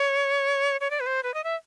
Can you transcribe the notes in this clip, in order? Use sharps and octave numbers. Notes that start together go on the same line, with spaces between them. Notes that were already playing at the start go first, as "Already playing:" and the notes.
Already playing: C#5
C#5
D5
B4
C5
B4
D#5
E5